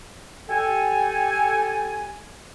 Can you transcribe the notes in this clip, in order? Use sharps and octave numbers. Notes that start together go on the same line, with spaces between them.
G4 A4 G#5